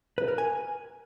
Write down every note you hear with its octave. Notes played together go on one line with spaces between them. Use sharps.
B4
A#4
G#5